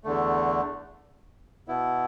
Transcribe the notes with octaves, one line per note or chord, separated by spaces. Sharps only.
E2 D3 A3
B2 B3 E4